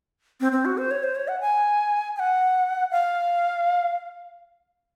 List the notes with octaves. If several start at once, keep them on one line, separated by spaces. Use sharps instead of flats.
C4
C4
F#4
C5
C#5
C5
C#5
F#5
G#5
G#5
F#5
F5